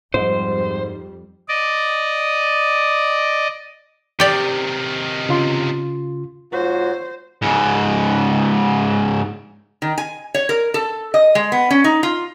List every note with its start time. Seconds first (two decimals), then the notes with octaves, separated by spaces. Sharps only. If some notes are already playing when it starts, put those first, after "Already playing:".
0.14 F2 G#2 G3 C5
1.48 D5 D#5
4.20 C3 D#3 G4 D5
5.29 C#3 F4 C6
6.52 G#2 F4 F#4 C5 C#5
7.42 G#2 C#3
9.82 D#3
9.98 G#5
10.34 C#5
10.49 A#4
10.74 A4
11.14 D#5
11.35 G#3
11.52 B3
11.70 C#4
11.84 D#4
12.03 F4